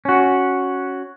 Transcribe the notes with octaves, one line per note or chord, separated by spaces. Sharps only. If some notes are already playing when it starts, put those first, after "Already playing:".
C#4 F#4